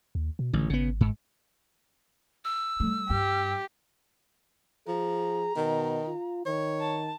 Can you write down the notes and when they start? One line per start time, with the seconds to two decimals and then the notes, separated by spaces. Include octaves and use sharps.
0.15 D#2
0.39 B2
0.53 A1 D3
0.70 G#1 C#3 B3
1.01 G#2
2.45 E6
2.80 G3 A3
3.10 G2 G4
4.88 F3 G#4 A#5
5.56 B2 D#3
6.07 F4
6.46 D#3 C#5
6.81 A5